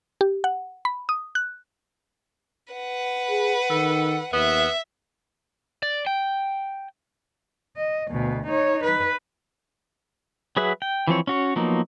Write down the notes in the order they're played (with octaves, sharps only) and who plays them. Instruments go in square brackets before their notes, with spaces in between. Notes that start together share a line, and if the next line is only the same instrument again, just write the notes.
[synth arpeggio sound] G4
F#5
B5
D#6
F#6
[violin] B4 F#5
[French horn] G#4
[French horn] D#3 [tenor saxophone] A4
[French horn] D#2 [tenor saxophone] B3 [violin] E5
[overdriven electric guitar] D5
G5
[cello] D#5
D2 B2
D#4 C#5
B4
[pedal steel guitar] F#3 G#4 B4 E5 F#5
G5
E3 F3 C4 C#5
C#4 F#4 C#5
F3 F#3 A#3 B3 D#4